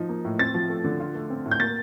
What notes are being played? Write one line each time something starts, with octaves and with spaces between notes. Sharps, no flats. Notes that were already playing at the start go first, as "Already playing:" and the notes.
Already playing: F3 D#4
A#3
A2
C4 A6
F3
A3
D3
F4
A3
C4
A2
G6
A#3 A6